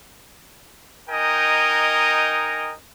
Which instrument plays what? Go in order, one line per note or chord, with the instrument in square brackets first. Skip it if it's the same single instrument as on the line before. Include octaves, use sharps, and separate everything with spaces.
[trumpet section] D#4 A#4 D#5 G5 G#5